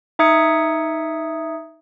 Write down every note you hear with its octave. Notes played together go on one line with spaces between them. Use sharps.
D#4 E5 D#6 G#6 C#7